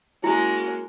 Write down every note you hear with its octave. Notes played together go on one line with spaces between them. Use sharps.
G#3 A#3 C#4 E4 F#4